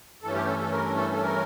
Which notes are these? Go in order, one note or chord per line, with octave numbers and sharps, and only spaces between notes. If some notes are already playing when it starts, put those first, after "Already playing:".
G2 E3 A3 C#4 A4
G4
A4
A4
A#4
A4
A4
A#4